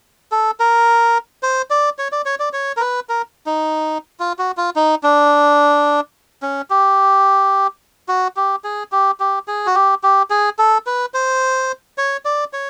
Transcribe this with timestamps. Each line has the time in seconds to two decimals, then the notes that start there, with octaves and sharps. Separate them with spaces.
0.32 A4
0.60 A#4
1.43 C5
1.70 D5
1.98 C#5
2.12 D5
2.26 C#5
2.39 D5
2.53 C#5
2.77 A#4
2.81 B4
3.09 A#4
3.46 D#4
4.20 F4
4.39 F#4
4.57 F4
4.76 D#4
5.03 D4
6.42 C#4
6.70 G4
8.08 F#4
8.36 G4
8.64 G#4
8.92 G4
9.20 G4
9.47 G#4
9.67 F#4
9.75 G4
10.03 G4
10.30 G#4
10.59 A4
10.86 B4
11.14 C5
11.98 C#5
12.25 D5
12.53 C#5